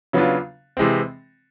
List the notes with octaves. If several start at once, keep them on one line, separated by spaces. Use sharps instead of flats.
C#3 F#3 B3 D4 F4
C3 E3 G#3 C4